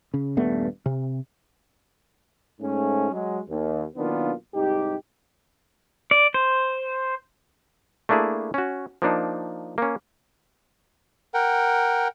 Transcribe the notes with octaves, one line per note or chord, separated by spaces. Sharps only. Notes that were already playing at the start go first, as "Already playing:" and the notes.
C#3
D#1 G2 A3 B3
C3
G#2 A3 C#4
F#3 G#3
D#2
B1 D#3 A#3 B3 D4 F4
C2 G#2 D#4 G4
D5
C5
A3 A#3 D4 E4 G#4
C#4 F#4
F3 A#3 D4 D#4
A#3 C#4
A#4 F#5 G5